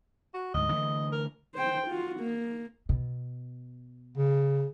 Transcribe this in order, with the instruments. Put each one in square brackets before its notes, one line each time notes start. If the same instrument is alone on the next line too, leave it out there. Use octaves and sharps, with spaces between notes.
[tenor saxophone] F#4
[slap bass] D2 G#2 [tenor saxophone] D#5
[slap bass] D3 E3 A3
[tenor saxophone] A#4
[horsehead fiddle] C5 G5
F4 F#4
A#3
[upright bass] B2
[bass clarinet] C#3